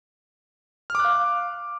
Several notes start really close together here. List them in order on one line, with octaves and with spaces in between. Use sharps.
F6 D6 F#6 F5